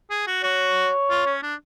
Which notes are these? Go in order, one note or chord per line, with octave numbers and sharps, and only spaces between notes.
G#4
F#4
F#4 C#5
F4
C#4
D4